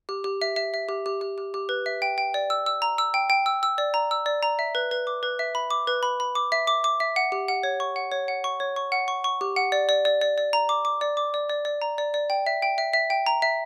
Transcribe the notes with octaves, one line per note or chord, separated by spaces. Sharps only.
G4
G4
E5
E5
E5
G4
G4
G4
G4
G4
B4
E5
G5
G5
D5
E6
E6
A#5
E6
G5
G5
E6
E6
D5
A#5
E6
D5
A#5
E5
B4
B4
D6
B4
E5
B5
D6
B4
B5
B5
D6
E5
D6
D6
E5
F#5
G4
F#5
C#5
C#6
F#5
C#5
F#5
C#6
C#5
C#6
F#5
C#6
C#6
G4
F#5
D5
D5
D5
D5
D5
A#5
D6
D6
D5
D6
D5
D5
D5
A#5
D5
D5
G5
E5
G5
E5
E5
G5
A#5
E5